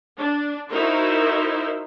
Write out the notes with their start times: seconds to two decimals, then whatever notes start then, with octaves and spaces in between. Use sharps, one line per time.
0.17 D4
0.70 D#4 E4 F#4 A#4 C5 E5